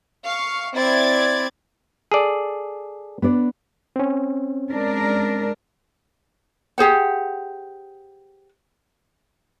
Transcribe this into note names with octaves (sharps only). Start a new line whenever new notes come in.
F5 C#6
C4 E4 D5 G#6 A6
G#4 A4 D5
B3 D4 D5
C4 C#4
G#3 D4 A#4
G4 G#4 C5 F#5